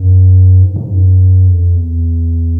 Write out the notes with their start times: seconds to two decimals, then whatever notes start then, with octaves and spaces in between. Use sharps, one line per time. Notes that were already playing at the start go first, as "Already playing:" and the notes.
Already playing: F#2
0.63 G#2
0.76 G#2
0.91 F#2
1.47 F2
1.76 E2